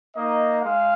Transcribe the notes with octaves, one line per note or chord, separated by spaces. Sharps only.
A#3 D#4 D#5
G#3 F5